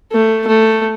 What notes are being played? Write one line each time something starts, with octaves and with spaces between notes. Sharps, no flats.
A3
A3